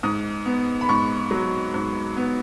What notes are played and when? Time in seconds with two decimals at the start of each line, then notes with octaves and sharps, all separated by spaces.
0.03 G#2 D#6
0.46 B3
0.81 B5
0.89 G#2 C#6
1.31 F#3
1.74 G#2
2.17 B3